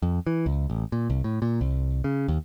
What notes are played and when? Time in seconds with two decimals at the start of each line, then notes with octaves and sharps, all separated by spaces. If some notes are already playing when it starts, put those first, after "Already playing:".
0.02 F2
0.27 E3
0.46 C#2
0.70 A1
0.92 A#2
1.10 C2
1.24 A2
1.42 A#2
1.61 C2
2.04 C#3
2.28 D#2